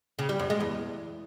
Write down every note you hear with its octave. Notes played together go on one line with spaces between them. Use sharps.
C#3
G3
F#2
G#3
E2